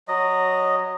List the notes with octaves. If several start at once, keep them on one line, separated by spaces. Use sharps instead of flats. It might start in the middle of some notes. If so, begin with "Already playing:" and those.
F#3 D#5